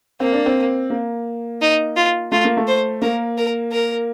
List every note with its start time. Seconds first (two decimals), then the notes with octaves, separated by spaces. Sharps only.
0.20 A#3 C4
0.33 D4
0.46 C4
0.90 A#3
1.61 D#4
1.96 F4
2.32 A3 F4
2.45 A#3
2.57 A3
2.67 C5
3.02 A#3 A#4
3.38 A#4
3.72 A#4